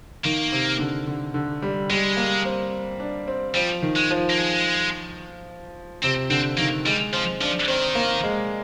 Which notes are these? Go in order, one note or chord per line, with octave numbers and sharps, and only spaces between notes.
D#3 A#3
C3
D3
D3
D3
G3
G3 G#3
A#3
C4
D4
C4
F3 G3
D#3
G#3
F3
A#3
G#3
C3 C4
D3 C4
D#3 A#3
G3 G#3
F3 C4
F3 D4
D#3 C4
A#3
G#3